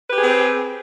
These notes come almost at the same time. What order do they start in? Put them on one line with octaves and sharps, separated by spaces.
B4 G4 G#4 C4